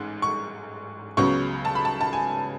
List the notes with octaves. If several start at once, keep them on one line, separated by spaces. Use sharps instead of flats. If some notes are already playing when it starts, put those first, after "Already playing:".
Already playing: A1 G#2 G#3
C#6
C#2 C#3 F#3 B3 C#6
A5
B5
A5
A5
G#5